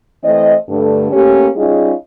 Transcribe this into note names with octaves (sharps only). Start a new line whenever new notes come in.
E3 A3 C4 D#5
G2 D3 A3
A3 A#3 C#4 G4
G3 C#4 D#4 F4 G#4 D#5